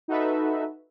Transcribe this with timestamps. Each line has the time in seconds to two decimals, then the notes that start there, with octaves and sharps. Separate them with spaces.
0.08 D#4 F#4 A4 B4 E5